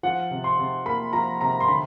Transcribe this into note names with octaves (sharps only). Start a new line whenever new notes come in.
F3 F#5
C3
C6
C3
A#3 B5
F3 A#5
C3 A#5
C6
D3 B5